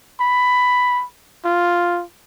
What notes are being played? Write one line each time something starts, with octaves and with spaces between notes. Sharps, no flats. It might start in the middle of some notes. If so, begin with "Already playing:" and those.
B5
F4